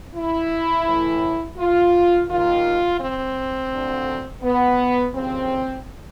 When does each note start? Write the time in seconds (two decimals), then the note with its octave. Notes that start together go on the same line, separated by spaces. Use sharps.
0.14 E4
0.86 A2 E3
1.58 F4
2.28 D#2 D#3 F4
3.00 C4
3.71 D2 D3 F3
4.43 B3
5.14 D#2 C#3 F3 C4